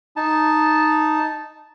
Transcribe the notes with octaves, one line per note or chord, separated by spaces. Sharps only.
D#4 A5